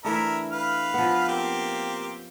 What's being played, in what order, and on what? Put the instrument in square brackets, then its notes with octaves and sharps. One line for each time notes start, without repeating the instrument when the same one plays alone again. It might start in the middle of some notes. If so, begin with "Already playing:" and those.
[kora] E3 A3 D4 [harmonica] A#4 E5 B5
[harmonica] B4 F5 F6
[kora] F3 B3
[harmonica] A#3 C4 G4